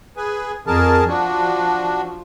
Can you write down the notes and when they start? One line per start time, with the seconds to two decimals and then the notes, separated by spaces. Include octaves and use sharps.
0.17 G#4 B4 G#5
0.67 F2 G#4 A#4 A5
1.09 F3 D4 F#4